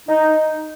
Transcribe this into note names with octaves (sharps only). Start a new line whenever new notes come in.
D#4